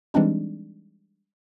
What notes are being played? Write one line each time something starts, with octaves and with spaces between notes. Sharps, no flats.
E3 G3 G#3 C4 D4 D#4